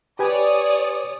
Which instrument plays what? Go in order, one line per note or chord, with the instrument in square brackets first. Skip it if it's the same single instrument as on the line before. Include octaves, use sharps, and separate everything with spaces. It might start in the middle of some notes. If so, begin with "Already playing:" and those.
[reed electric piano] G4 B4 G#5 [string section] C#5 D5 D#6